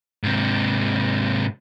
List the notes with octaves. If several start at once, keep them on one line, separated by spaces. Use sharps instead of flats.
G#2 C3